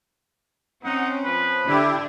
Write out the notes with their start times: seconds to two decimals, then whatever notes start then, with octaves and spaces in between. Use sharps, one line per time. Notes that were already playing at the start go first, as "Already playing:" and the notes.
0.84 C4 C#4 D#4 F#5
1.24 F3 B4
1.67 D3 D4 E4 G4